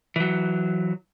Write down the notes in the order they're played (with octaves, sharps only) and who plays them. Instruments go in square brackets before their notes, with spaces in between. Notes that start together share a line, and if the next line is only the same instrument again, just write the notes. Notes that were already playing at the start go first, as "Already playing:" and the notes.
[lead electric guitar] E3 F#3